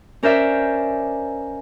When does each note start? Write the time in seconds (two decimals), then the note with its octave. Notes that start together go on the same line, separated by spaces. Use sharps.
0.23 C#4 A#4 C5 D5 E5